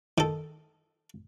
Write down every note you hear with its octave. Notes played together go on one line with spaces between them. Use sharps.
D#3 A4